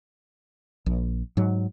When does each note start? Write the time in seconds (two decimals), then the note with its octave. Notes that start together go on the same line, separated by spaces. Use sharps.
0.86 A#1
1.37 G#2 F#3